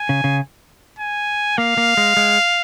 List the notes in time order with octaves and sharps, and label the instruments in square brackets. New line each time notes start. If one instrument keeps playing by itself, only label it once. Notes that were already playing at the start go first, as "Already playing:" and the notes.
Already playing: [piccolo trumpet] G#5
[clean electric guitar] C#3
C#3
[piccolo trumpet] G#5
[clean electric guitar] A#3 [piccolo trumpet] F5
[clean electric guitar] A#3
G#3
G#3